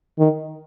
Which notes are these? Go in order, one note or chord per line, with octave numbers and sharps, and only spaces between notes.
D#3